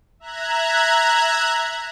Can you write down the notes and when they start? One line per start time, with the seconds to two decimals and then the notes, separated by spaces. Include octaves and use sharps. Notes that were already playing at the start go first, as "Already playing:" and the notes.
0.20 E5 A#5 F#6 G#6